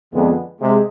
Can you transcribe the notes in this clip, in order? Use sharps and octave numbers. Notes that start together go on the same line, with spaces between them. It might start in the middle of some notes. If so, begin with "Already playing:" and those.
F2 D3 F3 G#3 B3
C3 G#3